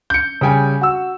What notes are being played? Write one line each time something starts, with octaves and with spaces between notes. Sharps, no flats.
G6 C#7
C#3 G3 G5 G#5
F#4 E6